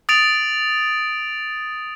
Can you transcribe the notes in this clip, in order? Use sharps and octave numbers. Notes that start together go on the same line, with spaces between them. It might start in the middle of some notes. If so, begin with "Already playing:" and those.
D#6 A6 D7 F7